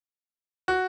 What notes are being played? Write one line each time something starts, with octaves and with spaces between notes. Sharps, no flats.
F#4